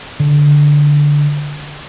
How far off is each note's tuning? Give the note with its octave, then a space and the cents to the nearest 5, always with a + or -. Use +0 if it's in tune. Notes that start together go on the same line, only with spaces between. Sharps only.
D3 -5